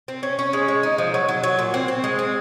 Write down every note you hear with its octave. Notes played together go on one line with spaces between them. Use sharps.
C4
C#4
C#4
G#3
G#3
D#4
F3
F#3
F#3
F#3
A#2
C4
C4
G#3
C4